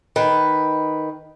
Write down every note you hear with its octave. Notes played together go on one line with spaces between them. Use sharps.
D#3 B4